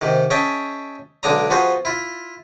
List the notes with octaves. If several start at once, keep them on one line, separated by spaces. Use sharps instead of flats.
G#2 C3 D#3
C#4 G#4 D#5 E5 G5 A5
B1 D3 G#3 D4 D#5 A#5
F3 B3 F4 F#4 G#4 C5
E4 F4